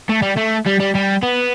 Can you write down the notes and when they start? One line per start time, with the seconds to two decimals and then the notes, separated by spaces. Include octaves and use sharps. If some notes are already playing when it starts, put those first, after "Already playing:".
0.09 A3
0.22 G3
0.37 A3
0.66 G3
0.80 G3
0.95 G3
1.23 B3